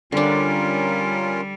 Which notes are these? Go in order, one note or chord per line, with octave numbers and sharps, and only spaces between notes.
D3 G3 C#4 D4 F4 A#4